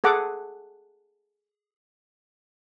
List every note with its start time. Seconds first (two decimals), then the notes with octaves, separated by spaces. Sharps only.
0.04 G#4 A4 F#5 D6